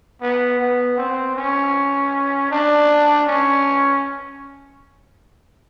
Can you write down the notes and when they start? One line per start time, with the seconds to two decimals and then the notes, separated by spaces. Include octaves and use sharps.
0.21 B3
0.59 B3
0.97 C4
1.36 C#4
2.51 D4
3.27 C#4